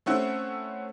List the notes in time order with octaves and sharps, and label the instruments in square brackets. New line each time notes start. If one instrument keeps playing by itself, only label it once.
[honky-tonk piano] A3 C4 C#4 E4 C5 F#5